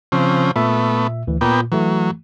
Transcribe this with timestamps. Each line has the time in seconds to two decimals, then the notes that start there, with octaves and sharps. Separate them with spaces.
0.12 C#3 F3 C4
0.56 A#2 A3 B3 E5
1.27 D2 E3
1.41 A#2 A#3 B3 G5
1.72 E3 F#3 A3